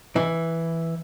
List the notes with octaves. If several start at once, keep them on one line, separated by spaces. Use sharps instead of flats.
E3